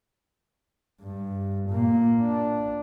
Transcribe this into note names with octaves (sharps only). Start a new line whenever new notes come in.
G2
A#2 A#3
D4